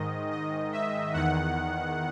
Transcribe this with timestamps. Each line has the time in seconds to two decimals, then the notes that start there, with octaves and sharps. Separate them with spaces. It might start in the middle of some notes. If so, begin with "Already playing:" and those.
Already playing: G#2 D#3 D#5
0.31 D#5
0.72 E5
1.13 E2 D#3 F#5